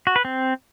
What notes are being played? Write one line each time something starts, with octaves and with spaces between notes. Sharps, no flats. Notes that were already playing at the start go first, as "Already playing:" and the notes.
F#4
B4
C4